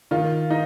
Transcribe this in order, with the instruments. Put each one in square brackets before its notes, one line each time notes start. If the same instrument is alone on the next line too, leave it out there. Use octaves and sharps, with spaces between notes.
[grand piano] D#3 [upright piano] F4
[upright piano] D#4